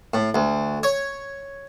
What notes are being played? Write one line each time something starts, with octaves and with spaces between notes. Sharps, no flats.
A2
D2
C#5